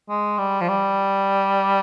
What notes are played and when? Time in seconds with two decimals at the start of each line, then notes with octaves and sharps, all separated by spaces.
0.09 G#3
0.38 G3
0.61 F3
0.68 G3